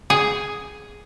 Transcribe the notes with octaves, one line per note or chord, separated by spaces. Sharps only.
G#4